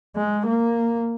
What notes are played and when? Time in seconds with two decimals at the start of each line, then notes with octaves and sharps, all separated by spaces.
0.16 G#3
0.46 A#3